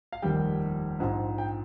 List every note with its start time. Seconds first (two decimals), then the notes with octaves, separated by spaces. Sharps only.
0.12 F5
0.22 F1 D#2 D#3 G3 G5
1.00 A#1 G#2 F3
1.38 G5